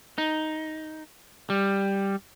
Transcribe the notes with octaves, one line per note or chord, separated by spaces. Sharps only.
D#4
G3